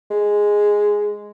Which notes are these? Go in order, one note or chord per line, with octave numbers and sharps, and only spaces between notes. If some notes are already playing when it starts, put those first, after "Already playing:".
G#3